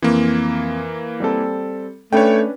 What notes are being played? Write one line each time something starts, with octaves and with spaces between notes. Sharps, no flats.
F2 E3 A#3
G3 C4 A4
A3 C#4 D4 B4 C#5 G5